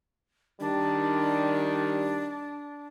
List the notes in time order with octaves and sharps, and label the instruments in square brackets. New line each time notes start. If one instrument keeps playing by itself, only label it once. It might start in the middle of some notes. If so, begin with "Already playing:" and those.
[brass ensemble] D#3 G3 [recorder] D4